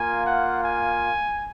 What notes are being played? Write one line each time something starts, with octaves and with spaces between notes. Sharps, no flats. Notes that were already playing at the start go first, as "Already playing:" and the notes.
Already playing: A#3 F4 G#5
F#5
G#5